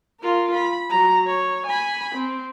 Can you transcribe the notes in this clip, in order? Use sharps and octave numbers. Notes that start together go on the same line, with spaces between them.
F4 A#4
B5
F#3 A#5
C#5
G#5 B5
C4